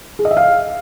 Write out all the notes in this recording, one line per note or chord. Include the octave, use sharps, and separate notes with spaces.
G#4
D#5
E5
F5